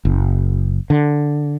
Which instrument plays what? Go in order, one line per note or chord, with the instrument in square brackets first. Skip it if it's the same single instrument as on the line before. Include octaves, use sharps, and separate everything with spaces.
[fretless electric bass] F#1
D3